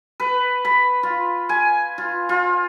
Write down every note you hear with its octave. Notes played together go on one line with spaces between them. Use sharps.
B4
B5
F4
G#5
F4
F4